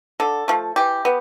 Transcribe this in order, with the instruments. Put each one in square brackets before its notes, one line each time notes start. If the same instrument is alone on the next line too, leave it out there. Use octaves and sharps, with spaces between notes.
[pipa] D3 A4
F3 A3
E3 G4
B3